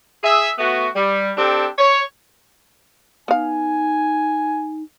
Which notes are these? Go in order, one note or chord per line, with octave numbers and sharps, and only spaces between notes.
G#4 E5
A3 B3 F#4
G3
C4 D4 G4 A4
C#5
B3 D#4 F5 G#5